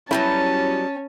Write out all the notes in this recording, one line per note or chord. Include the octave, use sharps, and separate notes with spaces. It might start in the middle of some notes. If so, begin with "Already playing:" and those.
F#3 G3 B3 C#4 E4 A5 B5